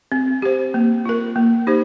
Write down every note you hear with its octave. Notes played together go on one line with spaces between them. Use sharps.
C4
G4 C5
A#3
F4 A#4
A#3
D#4 G4 C5